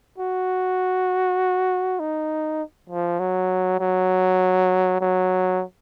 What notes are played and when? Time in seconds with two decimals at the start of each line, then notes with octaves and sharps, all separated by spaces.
0.18 F#4
2.00 D#4
2.90 F3
3.20 F#3
3.80 F#3
5.01 F#3